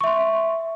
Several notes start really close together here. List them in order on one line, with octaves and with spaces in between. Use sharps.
C#6 E5 C6